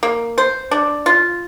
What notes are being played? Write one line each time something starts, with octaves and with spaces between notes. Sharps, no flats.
A#3
C5
D4
F4